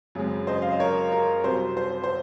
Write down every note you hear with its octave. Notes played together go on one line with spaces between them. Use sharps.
F#2 C#3 G#3 C4
C5 D#5
F5
D#5
A#4 C#5
A#4
C2 C3 F#3 C4 C5
C5
C5